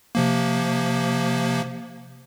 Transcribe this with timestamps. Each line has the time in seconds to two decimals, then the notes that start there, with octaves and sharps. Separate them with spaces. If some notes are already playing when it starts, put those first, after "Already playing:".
0.15 C3 F3 A#3